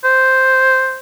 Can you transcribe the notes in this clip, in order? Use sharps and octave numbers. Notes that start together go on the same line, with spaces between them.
C5